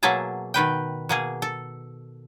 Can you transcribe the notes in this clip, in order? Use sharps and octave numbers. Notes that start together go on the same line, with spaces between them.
B2 F#3 A#3 G#4 E5 A5
B2 D#3 B4 G5
B2 A#3 G#4
A4